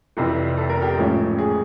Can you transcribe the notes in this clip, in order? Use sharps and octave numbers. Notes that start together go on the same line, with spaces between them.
F1 F2 C3 E3
A4
A#4
G4 A4
A1 G#2 F3 A3 C#4
G#4